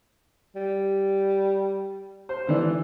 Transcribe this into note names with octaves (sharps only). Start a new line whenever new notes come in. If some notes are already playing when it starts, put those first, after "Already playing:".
G3
C5
D3 E3 D4